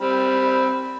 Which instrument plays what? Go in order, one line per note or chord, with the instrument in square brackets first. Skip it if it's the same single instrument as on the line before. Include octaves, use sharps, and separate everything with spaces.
[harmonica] G3 C4 B5